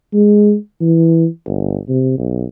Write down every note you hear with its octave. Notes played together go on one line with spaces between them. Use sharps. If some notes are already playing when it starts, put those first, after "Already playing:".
G#3
E3
G1
C3
B1